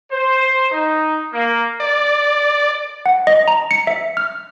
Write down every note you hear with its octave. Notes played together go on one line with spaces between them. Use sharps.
C5
D#4
A#3
D5
F#5
D#5
A#5
C#7
E5
F6